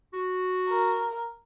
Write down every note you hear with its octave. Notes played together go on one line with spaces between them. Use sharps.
F#4
A#4